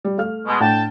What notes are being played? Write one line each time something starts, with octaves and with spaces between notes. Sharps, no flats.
G3
A3 F5 F6
B2 G#3
A2 D4 F#5 G5 A5